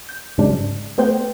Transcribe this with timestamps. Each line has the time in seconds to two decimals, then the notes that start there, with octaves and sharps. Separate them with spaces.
0.09 G6
0.38 G#2 C#3 F#3 G#3 D4
0.98 A3 B3 C5 F#5 G5